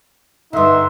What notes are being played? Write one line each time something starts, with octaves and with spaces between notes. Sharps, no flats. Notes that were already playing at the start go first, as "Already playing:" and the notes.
G2 D3 D#4 E5 C6